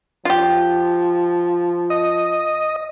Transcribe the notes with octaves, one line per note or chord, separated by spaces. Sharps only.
F3 F4 G4
D#5